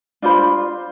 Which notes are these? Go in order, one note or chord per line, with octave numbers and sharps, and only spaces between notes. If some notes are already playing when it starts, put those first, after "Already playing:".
D4 F4 C5 B5